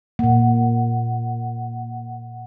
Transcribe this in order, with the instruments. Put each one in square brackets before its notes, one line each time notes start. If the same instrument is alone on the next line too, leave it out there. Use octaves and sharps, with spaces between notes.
[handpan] A#2 A#3 [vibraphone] F#5